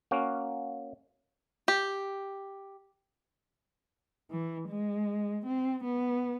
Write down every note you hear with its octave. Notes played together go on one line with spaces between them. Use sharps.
A#3 C#4 F#4
G4
E3
G#3
C4
B3